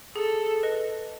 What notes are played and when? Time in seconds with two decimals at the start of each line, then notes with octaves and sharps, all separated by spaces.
0.16 G#4 A4
0.63 B4 D#5